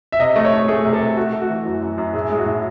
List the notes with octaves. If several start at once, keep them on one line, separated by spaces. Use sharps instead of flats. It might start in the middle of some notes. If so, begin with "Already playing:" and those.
E5
C3 D#5
A3 D#5
C#5
A3
A3 G#4
C3
A4
C3
A3 F#4
A3
F#4
E3
F#2
F#2
F#2
A2 G#4
G#3 G#4
F#4
A2